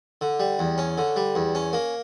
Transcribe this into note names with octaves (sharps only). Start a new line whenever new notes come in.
D3
G3
E2
C#4
D3
G3
E2
C#4
A#3